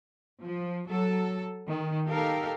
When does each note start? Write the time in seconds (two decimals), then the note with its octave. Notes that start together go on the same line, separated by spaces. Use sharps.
0.41 F3
0.87 F#3 A4
1.68 D#3
2.06 D#4 G4 A4 A#4 F5